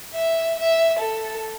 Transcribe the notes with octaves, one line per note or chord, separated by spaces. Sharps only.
E5
E5
A4